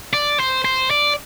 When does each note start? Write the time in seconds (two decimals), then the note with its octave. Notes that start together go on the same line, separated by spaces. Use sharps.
0.13 D5
0.39 C5
0.65 C5
0.91 D5